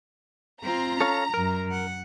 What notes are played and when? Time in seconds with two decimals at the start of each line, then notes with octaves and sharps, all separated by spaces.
0.63 C4 F4 A#5
1.01 C#4 A4 C#5 F5
1.34 F#2 A#4
1.71 F#5